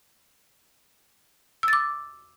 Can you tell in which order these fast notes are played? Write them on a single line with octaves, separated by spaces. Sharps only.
E6 A6 D6